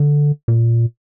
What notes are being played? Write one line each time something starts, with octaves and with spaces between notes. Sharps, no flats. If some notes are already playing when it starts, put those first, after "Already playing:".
Already playing: D3
A#2